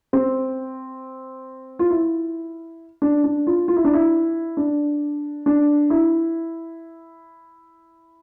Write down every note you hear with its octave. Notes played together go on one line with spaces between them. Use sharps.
C4
F4
E4
D4
D4
F4
F4
E4
D4
E4
D4
D4
E4